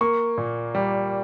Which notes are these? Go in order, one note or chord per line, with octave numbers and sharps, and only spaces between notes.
A#3 C#6
A#2
G3